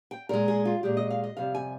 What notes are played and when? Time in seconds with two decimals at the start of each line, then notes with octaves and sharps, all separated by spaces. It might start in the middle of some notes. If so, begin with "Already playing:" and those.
0.11 G5
0.29 A#2 G#3 A#4
0.48 G#4
0.65 F4
0.83 A#2 G#3 G4
0.97 D#5
1.11 F5
1.24 D#5
1.37 F2 C3 G3 F5
1.55 G#5